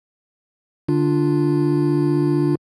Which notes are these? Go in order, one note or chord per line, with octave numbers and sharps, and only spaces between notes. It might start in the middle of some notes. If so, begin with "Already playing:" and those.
D3 D4 F4